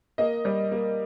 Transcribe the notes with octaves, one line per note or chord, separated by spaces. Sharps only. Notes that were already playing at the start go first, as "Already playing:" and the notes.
A#3 D#5
G3
A#3